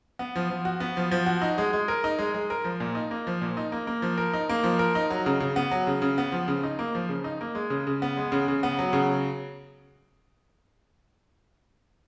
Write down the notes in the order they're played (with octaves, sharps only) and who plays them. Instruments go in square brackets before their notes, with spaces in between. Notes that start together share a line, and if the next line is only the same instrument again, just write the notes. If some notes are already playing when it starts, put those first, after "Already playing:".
[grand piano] B3
F3
F3
F#4
B3
F3
F3
F#4
D#4
G#3
G#3
A#4
D#4
G#3
G#3
A#4
F3
A#2
D#4
A#3
F3
A#2
D#4
A#3
A#3
F3
A#4
D#4
A#3
F3
A#4
D#4
F#3
C#3
C#3
B3
F#3
C#3
C#3
B3
F3
C#3
D#4
A#3
F3
C#3
D#4
A#3
G#3
C#3
C#3
B3
G#3
C#3
C#3
B3
F#3
C#3